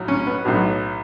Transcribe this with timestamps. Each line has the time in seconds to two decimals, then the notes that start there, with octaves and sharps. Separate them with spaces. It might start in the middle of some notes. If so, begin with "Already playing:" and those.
Already playing: B1 A2 F#3
0.08 C#4
0.27 B3
0.45 B1 A2 F#3